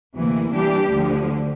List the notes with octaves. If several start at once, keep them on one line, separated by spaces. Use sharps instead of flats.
D2 C3 E3 A#3
E3 G3 D4 G4
D2 D3 F3